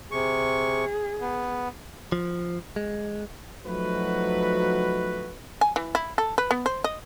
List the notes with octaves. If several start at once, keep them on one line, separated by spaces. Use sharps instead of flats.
C3 G#4 C#6
B3
F3
G#3
F3 F#3 A3 D#4 F#4 B4
G#5
E3
E4
A4
B4
B3
C5
D#5